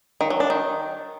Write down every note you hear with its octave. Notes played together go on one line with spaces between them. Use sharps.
D#3
F#3
D4
D#3